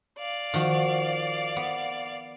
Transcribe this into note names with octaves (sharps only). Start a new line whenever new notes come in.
D5 F5
D#3 F3 F#4
B3